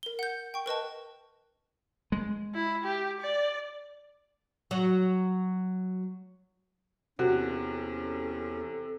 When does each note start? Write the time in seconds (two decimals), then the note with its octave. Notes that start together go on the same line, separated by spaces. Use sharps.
0.03 A#4 G7
0.19 F#5 G6
0.54 G5 C#6
0.66 A#4 B4 D#5 A5
2.12 G#3
2.54 E4
2.84 G4
3.20 D5
4.71 F#3
7.19 E2 C3 C#4 F#4 A4